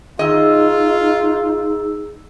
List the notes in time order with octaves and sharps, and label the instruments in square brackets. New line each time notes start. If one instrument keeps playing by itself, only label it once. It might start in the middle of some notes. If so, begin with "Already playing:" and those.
[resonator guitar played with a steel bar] D#3 D#5 [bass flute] D#4 [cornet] F4 [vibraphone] G#4 E6